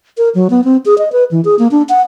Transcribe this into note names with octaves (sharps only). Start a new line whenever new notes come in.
A#4
F#3
B3
C4
G#4
D#5
B4
E3
G#4
A#3
D4
F#5